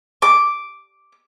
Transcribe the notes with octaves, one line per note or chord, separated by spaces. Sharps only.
D6